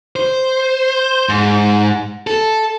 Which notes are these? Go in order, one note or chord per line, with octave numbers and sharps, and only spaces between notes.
C5
G#2
A4